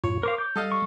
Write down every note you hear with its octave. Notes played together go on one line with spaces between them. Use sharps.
F#2 A2 F4 C#5
A#4 C5 F5 D6
G6
G3 A4 D#5 F5
C#6